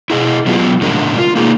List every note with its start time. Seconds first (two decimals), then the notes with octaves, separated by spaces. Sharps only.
0.10 E4 G#4 D#5
0.46 F#3 B3 F4 G4
0.81 A2 C#3 D4 A#4
1.18 F4
1.36 A#3 D#4 G#4